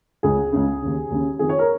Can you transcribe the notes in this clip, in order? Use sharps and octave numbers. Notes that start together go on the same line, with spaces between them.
C#2 C#3 G#4
C#2 C#3
D#2 C#3
D#2 C#3
F2 D#3 G#4
C#5
A#4